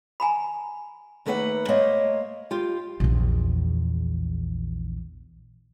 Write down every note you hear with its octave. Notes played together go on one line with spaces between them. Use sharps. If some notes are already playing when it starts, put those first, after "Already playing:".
G#5 A#5 B5
D#2 A3 A#3 B4 D5 F#5
A3 A#3 C5 C#5 D#5
F4 G4
A#1 E2